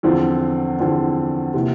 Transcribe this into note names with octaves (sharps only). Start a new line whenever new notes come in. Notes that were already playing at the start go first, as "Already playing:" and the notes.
E2 D3 F3 C4 F4
E2 D3 F3 C4 F4
C3 E3 A#3